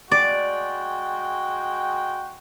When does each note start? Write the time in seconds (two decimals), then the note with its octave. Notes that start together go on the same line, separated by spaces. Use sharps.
0.11 G#3 F#4 D5 G5